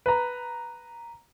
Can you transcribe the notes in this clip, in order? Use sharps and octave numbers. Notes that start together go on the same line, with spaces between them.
B4 A#5